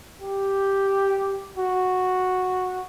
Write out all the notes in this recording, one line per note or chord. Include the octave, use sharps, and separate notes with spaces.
G4
F#4